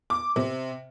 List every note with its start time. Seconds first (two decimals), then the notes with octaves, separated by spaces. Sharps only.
0.10 D6
0.36 C3